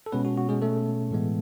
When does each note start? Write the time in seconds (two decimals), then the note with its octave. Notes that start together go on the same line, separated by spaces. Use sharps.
0.06 A4
0.12 B2 G#3 B3 C#4 B4
0.25 F#4
0.38 F#4
0.49 G#3 G#4
0.62 A3 A4
1.11 A2 E3 G#3 B3